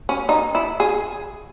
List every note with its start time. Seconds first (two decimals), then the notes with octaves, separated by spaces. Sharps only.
0.09 C#4
0.29 D#4
0.55 E4
0.80 G#4